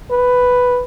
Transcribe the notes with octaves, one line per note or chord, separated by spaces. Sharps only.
B4